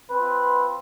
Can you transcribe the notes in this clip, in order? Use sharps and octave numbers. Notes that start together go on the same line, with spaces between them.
C4 F4 B4